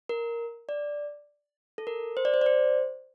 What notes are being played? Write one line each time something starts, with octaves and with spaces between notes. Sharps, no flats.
A#4
D5
A4
A#4
C5
D5
C5
D5
C5